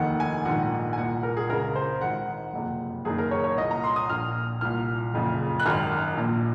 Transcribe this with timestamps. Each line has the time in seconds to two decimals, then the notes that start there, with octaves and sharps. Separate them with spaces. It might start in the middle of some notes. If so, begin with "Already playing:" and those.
Already playing: F1 D#2 D#3 F#5
0.20 G#5
0.45 A#1 G#2 D#3 F#5
0.93 G#5
0.97 C2 A#2 F#5
1.23 A#4
1.37 G#4
1.49 C#2 C#3 A#4
1.76 C5
2.01 G#1 G#2 D#3 F#5
2.53 F#1 F2 C3
3.05 F#1 F#2 D#3 G#4
3.18 A#4
3.31 C#5
3.44 C#5
3.57 C2 A#2 D#5
3.71 A#5
3.84 C6
3.96 D#6
4.09 A#1 A#2 F6
4.61 C2 A#2 F6
5.13 F#1 F2 C#3
5.60 F#6
5.65 G#1 F#2 D#3 F6
6.17 A#1 A#2